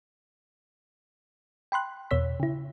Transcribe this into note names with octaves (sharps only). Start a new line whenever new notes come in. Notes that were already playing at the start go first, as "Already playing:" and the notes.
G5 B5 C6 F#6
E2 B2 C#5 E6 B6
C#3 E4